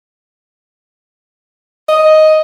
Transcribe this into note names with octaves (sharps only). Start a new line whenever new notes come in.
D#5